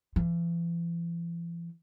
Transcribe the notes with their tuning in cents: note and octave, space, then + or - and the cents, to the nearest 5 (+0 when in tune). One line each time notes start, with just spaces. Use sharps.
E3 +45